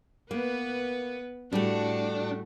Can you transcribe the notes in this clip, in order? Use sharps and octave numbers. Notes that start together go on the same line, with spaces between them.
A#3 B3 B4
A2 G3 A3 D4 F#4